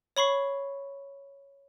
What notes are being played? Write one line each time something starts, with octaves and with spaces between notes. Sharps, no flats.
C#5 B5 C#6 C7